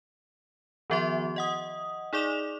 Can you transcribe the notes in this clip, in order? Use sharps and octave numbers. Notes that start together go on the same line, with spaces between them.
D#3 F3 B3 F#4 E5 C6
D#5 F#5 D#6
D#4 G#4 D5 D6 E7 F7